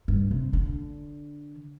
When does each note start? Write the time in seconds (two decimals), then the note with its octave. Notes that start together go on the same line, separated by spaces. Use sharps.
0.08 G2
0.31 C3
0.53 D3